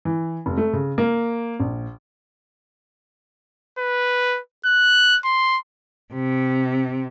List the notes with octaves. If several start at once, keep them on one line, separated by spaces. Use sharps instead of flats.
E3
F1
A3
C#3
A#3
A#1
B4
F#6
C6
C3